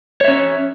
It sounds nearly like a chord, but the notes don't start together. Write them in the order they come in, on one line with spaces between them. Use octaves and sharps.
C#5 E5 C#4